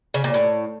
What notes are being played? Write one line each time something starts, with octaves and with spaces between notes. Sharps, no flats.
C#3
A#2
A2